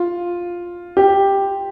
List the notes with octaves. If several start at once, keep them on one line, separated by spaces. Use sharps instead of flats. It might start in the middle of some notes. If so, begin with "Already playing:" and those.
Already playing: F4
G4